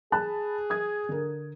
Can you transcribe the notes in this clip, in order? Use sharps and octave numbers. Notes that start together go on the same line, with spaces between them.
G#4 A5 B5 F#6
D#6 G#6
D3 A#4